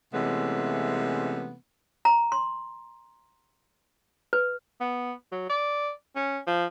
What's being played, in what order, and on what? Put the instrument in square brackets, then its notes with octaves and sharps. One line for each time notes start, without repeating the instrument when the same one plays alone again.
[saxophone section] C3 E3 G#3 A3 B3 C#4
[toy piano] A#5
C6
B4
[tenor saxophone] B3
F#3
D5
C#4
F3